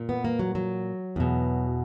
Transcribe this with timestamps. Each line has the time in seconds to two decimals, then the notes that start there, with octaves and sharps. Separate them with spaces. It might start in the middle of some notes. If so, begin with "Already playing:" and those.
Already playing: A#2
0.09 B3
0.24 A#3
0.39 F#3
0.55 F#3
1.16 E2 B2